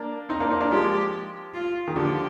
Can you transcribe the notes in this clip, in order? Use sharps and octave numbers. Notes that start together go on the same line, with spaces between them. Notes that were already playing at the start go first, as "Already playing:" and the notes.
Already playing: A#3 D4
C4 D#4
A#3 D4
C4 D#4
A#3 D4
F3 G#3 G4
F4
D#3
D3 F3 G4